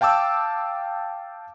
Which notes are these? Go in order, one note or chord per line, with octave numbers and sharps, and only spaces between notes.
F5 G5 A5 D6 E6